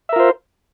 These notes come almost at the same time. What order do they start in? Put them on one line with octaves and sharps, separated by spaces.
E5 A#4 F4 C5